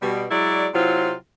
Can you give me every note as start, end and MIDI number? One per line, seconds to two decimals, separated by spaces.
0.02 0.25 47
0.02 0.25 55
0.31 0.67 54
0.31 0.67 56
0.31 0.67 64
0.31 0.67 74
0.74 1.13 48
0.74 1.13 54
0.74 1.13 60
0.74 1.13 64
0.74 1.13 65